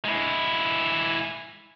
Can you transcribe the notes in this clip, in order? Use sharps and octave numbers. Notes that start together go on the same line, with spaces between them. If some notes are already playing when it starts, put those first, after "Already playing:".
G#3 E4